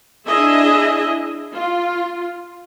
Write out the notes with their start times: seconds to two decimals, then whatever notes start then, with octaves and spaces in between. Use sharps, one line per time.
0.27 D4 E4 G#4 D#5 E5
1.56 F4